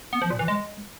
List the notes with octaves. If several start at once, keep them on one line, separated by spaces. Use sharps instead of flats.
B3
F3
A#2
E3
G#3